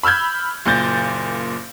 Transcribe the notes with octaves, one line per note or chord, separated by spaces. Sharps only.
B5 E6 F6 G6 G#6
F#1 A#2 G6 A6 A#6